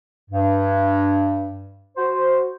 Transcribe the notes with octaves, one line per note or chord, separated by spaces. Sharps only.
G2
F#4 C5